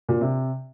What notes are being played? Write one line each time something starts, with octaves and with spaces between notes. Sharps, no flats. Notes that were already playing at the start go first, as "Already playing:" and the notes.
A#2
C3